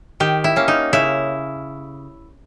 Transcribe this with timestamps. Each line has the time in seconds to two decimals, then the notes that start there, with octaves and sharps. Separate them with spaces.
0.20 D#3 G4
0.44 E4
0.56 A#3 C#4
0.68 D#4
0.93 C#3 E4